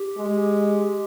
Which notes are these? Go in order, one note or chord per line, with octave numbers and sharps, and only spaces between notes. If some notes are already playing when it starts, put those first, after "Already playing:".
Already playing: G4
G#3